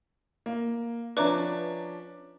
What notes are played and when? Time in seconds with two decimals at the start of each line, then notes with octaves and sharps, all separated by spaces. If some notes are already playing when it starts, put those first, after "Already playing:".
0.46 A#3
1.17 F3 C#4 D4 B4 D5 E5 A#5 D6